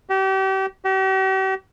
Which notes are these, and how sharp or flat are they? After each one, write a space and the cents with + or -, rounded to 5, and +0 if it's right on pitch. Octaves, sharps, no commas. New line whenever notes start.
G4 -35
G4 -45